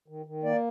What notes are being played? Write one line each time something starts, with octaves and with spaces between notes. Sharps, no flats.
D#3
D#3
A#3 D5